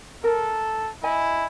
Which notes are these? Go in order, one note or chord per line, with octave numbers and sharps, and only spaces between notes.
A4 A#4
E4 D#5 G#5